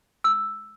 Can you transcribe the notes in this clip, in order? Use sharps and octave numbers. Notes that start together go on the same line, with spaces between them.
E6